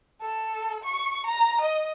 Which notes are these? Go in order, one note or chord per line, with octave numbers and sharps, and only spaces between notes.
A4
C#6
A#5
D#5